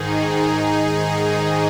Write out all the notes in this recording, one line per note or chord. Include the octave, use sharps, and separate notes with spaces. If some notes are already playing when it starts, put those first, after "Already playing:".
Already playing: G#2 D#3 D#4 G#4
G#2 D#3